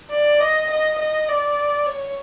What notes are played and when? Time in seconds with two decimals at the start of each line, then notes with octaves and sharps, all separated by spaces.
0.10 D5
0.40 D#5
0.69 D#5
0.98 D#5
1.28 D5
1.86 C#5